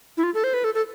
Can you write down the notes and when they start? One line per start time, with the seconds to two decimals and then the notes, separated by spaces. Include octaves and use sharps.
0.17 E4
0.23 F4
0.34 A4
0.44 C5
0.54 B4
0.64 A4
0.74 A4